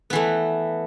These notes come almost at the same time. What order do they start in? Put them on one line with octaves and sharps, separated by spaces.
B3 E3 A3